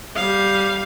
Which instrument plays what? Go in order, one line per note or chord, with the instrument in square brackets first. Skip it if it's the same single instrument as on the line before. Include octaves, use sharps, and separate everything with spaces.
[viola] G3 F5